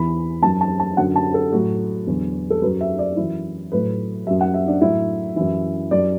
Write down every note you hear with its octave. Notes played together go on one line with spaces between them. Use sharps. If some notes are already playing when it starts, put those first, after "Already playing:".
Already playing: E2 E3 B5
F#2 F#3 A5
A5
A5
F#2 D3 F#3 F#5
A5
A4
A2 F#3 F#4
E2 D3 F#3
A4
F#2 F#3 B4
E5
D5
F#2 E3 E4
A2 F#3 B4
F#2 F#3 E5
F#5
E5
D4
A2 F#3 E4
F#2 E3 E4
F#2 F#3 D5